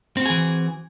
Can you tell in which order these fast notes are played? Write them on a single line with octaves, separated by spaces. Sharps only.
C4 F#4 G#4 E3